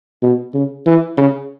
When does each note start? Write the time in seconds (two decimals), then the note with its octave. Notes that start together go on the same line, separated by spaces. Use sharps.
0.23 B2
0.54 C#3
0.86 E3
1.17 C#3